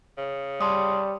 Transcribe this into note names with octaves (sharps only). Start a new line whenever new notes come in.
C#3
G3 A5 C6 D#6